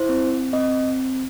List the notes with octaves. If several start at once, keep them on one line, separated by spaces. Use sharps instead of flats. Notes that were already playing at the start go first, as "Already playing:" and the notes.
Already playing: E4 C5
C4
C4 D#5